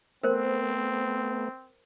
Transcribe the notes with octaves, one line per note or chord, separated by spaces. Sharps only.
A3 B3 C4 A#4 C5